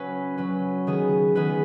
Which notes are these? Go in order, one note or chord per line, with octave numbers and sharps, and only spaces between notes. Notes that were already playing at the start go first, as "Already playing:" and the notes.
Already playing: F#3 C#4 B4
F#3 C#4 B4
D#3 B3 G#4 B4
D#3 B3 G#4 B4